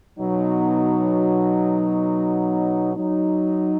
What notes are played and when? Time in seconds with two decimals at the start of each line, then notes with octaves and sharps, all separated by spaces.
0.18 B2 F#3 D#4
2.94 F#3 D#4